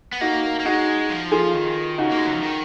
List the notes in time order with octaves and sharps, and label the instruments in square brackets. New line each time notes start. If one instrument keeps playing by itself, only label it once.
[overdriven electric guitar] B3
[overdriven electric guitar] A#3 [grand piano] D#4 F#4
[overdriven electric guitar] A#3
[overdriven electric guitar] G#3 [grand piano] D#4 F#4
[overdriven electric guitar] F3
[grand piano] F4 G#4
[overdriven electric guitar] D#3
[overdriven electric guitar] C#3 [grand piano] D#4 F#4
[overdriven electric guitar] A#3
G#3
F#3
F3
D#3